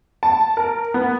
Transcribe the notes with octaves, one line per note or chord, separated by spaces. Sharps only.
A5
A#4
B3